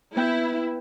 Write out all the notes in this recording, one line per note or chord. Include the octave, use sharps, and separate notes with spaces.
B3 E4 G5 G6